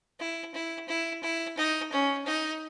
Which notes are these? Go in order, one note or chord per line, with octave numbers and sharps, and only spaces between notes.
E4
E4
E4
E4
D#4
C#4
D#4